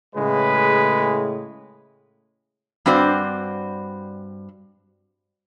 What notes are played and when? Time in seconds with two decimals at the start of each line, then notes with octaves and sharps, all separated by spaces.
0.16 A2 C#3 G#3 B4
2.86 G2 C4 F#4 C5 D5